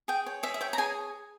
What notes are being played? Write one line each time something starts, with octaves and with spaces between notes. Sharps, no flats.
G#4 G5
C#5
G#4 E5
E5
C#5 G5
A#5
G#4 G#5